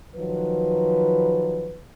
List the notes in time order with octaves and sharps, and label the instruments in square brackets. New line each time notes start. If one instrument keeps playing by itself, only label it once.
[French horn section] D#3 F3 F#3 B4